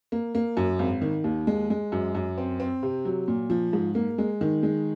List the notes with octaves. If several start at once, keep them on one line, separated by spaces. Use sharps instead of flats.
A#3
A#3
F#2
G#1
D#3
D#2
G#3
G#3
F#2
F#2
C4
C4
C3
F#3
A#2
F3
G#2
A#3
G#3
D#3
G#3